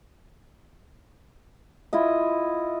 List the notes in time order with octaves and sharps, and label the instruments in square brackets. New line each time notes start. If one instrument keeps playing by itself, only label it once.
[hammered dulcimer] E4 F4 D#5